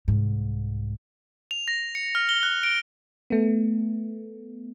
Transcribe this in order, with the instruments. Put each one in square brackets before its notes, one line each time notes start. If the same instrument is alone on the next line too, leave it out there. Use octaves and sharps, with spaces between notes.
[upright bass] C2 G#2
[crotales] F7
A#6
C#7
F6
G7
F#6
D7
[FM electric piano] A3 B3